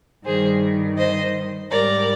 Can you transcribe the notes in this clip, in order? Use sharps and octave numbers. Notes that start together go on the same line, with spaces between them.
G2 D#3 G3 G#4 C5
C5 D#5
G#2 G3 A#4 D5